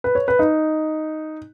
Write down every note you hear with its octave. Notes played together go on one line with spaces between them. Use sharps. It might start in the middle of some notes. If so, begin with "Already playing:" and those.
B4
C#5
B4
D#4